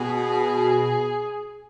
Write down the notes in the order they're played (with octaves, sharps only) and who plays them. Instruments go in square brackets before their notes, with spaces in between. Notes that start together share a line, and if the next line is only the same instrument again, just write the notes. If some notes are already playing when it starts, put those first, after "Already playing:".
Already playing: [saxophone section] B2 [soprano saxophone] G#4